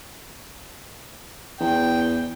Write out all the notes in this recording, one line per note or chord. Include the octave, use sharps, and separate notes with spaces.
E2 G5